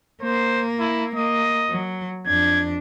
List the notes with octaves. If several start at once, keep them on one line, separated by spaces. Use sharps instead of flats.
A#3 C5
E4
A#3 D#5
F#3
F2 D4 G#6